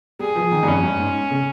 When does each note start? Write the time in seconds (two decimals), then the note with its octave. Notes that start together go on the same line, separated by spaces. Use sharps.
0.19 G3 G#4
0.36 F3
0.51 D#3
0.63 G2
0.67 F2 C#4
0.83 G2
0.99 G#2
1.30 C#3